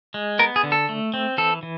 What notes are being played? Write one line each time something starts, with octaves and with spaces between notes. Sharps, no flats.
G#3
B3 A#4
G#4
D3
A4
A3
C4
E3 A4
E3